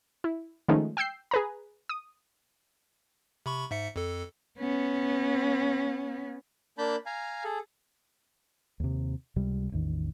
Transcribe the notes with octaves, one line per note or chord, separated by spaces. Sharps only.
E4
D#3 F3 G#3 A3 C#4 D#4
G5 E6 G6 C7
G#4 B4 A#5
D#6
C3 B5 C#6
G#2 E5 C#7
F2 A4
B3 C#4
A#3 D4 A5 B5 G6
F5 G#5 A#5
G#4 A4
D#2 C3
C#2 C3 G3
A1 E2 D#3